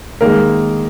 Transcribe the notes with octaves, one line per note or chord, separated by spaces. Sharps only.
D#3 G#3 A#3 A#4